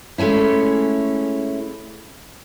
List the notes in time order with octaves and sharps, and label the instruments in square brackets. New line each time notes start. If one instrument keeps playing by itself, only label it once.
[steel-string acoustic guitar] G#3 A3 C#4 E4